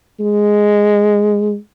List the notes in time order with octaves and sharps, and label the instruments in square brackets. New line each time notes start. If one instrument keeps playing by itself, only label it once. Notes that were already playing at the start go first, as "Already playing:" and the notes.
[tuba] G#3